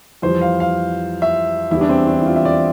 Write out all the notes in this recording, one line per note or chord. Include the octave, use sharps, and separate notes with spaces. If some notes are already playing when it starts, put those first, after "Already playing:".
F2 E3 G3 C5
F5
F5
E5
E2 E3 G3 E4
D4
C4
D4
E4
F4
E5
D5